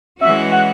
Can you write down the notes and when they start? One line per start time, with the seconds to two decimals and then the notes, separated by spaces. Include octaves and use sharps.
0.21 E3 G#3 C#4 F#4 E5
0.52 F#5